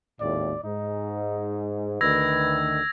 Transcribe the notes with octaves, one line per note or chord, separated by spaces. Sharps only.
G#1 D#2 A2 D5
G#2 D#4
D2 D#3 B4 E6 G#6 A#6